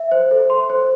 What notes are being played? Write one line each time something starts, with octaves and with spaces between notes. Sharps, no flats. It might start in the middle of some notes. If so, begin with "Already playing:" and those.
Already playing: E5
C5
A4
C6
C5